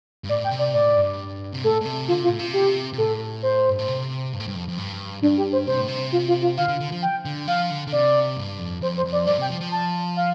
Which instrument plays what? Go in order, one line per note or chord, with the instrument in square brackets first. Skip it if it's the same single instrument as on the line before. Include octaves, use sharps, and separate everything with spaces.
[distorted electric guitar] G2
[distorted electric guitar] A2 [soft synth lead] D5
[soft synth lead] G5
[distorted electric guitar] C3
[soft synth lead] D5
[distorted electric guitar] A2 [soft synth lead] D5
[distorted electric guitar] G2
C3
[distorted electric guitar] A2 [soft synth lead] A4
[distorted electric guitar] A2
C3
[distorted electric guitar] D3 [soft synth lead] F4
[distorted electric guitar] C3
[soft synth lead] F4
[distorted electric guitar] A2
C3
[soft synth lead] G4
[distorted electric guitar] C3
[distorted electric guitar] A2 [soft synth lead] A4
[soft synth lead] C5
[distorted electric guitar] G2
A2
C3
G2
A2
G2
F2
F2
G2
[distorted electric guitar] G2 [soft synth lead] D4
[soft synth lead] G4
C5
[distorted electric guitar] C3 [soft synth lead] C5
[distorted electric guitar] A2
C3
[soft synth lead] F4
F4
F4
[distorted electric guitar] D3 [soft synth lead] F5
[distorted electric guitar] D3
D3
F3
[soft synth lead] G5
[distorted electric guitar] D3
[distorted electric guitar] F3 [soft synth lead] F5
[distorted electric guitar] D3
D3
[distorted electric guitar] C3 [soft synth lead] D5
[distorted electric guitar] G2
F2
[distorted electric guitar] F2 [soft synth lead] C5
[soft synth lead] C5
[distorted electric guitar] F2
[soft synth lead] D5
[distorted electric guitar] G2 [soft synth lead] D5
[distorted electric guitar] C3 [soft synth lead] G5
[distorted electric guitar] F3
F3
[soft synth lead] A5
F5